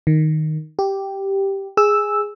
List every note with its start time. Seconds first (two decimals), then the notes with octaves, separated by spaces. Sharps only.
0.07 D#3
0.79 G4
1.77 G#4 E6